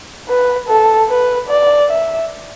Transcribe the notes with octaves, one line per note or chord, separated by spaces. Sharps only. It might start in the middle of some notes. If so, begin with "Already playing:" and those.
B4
A4
B4
D5
E5